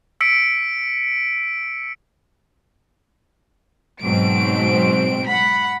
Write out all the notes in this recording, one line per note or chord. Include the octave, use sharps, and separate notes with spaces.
E6 B6 C#7 D7
G#2 B2 F#3 C4 D7
F#5 B5